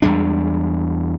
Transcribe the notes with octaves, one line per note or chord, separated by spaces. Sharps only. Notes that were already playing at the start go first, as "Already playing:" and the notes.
E2 G3 G#3 D4